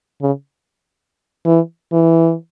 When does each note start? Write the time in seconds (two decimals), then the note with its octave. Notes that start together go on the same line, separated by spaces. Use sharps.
0.22 C#3
1.45 E3
1.92 E3